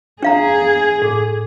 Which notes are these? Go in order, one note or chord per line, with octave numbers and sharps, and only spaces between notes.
D4 G#4 F5 A#5
A2 D6